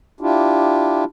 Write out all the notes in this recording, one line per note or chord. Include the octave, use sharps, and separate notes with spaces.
D4 E4 F4 G4